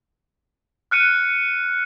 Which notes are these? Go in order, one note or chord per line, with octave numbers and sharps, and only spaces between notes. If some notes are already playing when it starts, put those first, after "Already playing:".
F6 F#6 C#7 D#7